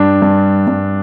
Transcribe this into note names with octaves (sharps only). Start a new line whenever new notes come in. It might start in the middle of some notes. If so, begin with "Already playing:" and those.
Already playing: G2 D4
G2
G2